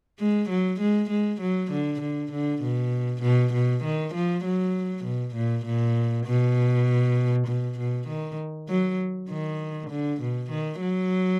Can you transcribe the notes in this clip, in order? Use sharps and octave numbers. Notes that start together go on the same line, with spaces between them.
G#3
F#3
G#3
G#3
F#3
D3
D3
D3
B2
B2
B2
D#3
F3
F#3
B2
A#2
A#2
B2
B2
B2
D#3
F#3
D#3
D3
B2
D#3
F#3